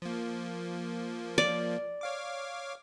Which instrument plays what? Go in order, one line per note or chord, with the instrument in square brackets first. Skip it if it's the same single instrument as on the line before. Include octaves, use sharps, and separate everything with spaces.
[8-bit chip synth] F3 A#3
[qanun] D5
[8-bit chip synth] C#5 F5 D6